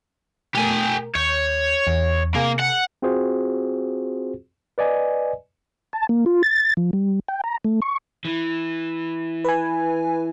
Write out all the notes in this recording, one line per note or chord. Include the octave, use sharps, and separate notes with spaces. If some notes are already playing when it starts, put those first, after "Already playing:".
B2 A3 G4 A#4 G#5
D#2 C#5 G6
E2
C3 A#3 G#4 A#4
F#5
C4 F4 F#4 G#4 C5
B4 D5 D#5 G#5
A5
A#3
F4
A6
F3
G3
G5
A#5
A3
C#6
E3
B4 G#5